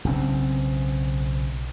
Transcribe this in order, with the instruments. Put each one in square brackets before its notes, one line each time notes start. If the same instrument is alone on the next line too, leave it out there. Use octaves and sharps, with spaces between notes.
[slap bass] B1 C#3 C4